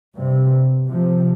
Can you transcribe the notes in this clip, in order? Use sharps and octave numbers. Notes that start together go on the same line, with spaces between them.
G2 C3
C3 F3